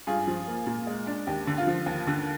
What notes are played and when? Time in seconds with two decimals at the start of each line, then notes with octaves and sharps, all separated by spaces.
0.07 G2 F4 G#4
0.27 F3
0.48 A#3
0.66 A#2
0.87 G#3
1.07 D4
1.27 D#2 G4
1.47 D3
1.57 F4
1.67 F3
1.86 D#2
2.07 D3